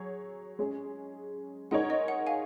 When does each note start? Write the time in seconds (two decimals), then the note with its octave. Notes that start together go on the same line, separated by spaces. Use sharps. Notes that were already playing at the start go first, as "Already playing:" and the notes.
Already playing: F#3 G#4 C#5
0.59 G#3 C#4 G#4
1.71 G#3 D#4 A#4 C#5 F#5
1.90 D#5
2.08 F#5
2.27 F5 G#5